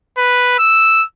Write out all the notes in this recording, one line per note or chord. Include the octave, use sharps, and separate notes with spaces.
B4
E6